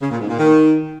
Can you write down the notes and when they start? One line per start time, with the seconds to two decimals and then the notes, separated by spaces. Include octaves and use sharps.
0.02 C#3
0.11 A#2
0.20 G#2
0.29 A#2
0.37 D#3